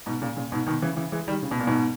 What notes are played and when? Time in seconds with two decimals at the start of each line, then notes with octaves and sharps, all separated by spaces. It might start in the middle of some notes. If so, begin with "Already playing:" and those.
0.06 G#2 B2
0.21 A#2 C#3
0.36 A#2 C#3
0.52 G#2 B2
0.67 B2 D#3
0.82 C#3 E3
0.97 C#3 E3
1.12 E3 G#3
1.28 D#3 G3
1.43 C#3
1.51 B2
1.60 A#2
1.67 G#2 B2